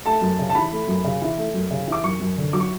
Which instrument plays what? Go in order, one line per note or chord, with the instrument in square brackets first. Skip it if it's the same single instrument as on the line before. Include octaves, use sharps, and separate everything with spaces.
[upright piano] A3 A5
F#2
C#3
A5
E3 B5
A3
F#2
C#3
E3
A3
F#2
C#3
E3
D6
F#2 C#6
F#2
D3
F#3 D6
C#6